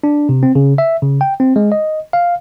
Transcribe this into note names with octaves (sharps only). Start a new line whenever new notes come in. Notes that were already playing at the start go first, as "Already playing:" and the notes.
D4
C3
C4
C#3
E5
C#3
G5
C4
G#3
D#5
F5